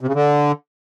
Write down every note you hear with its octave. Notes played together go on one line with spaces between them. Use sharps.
C3
C#3
D3